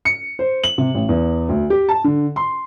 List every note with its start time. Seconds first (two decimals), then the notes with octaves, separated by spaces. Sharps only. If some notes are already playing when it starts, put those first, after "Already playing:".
0.05 C#7
0.39 C5
0.64 F#7
0.78 C3
0.95 A1
1.09 E2
1.49 D2
1.70 G4
1.89 A5
2.04 D3
2.36 C6